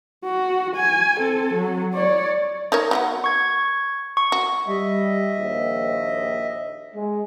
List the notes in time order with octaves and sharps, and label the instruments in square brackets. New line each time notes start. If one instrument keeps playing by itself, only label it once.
[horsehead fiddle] F#4
G#5
C4 A4
F#3
C#5 D5
[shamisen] D#4 A#4 C#5
F#3 B3 F#5
[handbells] C#6 G#6
C#6
[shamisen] F#4
[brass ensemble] G3 [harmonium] D#5 E5
[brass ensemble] A#1 D#2
G#3